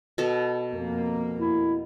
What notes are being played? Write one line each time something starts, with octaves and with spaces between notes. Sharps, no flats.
B2 A4
F2 A#3
E4